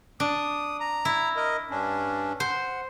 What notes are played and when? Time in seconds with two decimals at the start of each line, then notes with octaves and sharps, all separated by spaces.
0.20 D4 D#6
0.80 A#5
1.05 E4
1.36 A#4 D#5
1.71 G2 C#4 D4
2.40 C5 F#5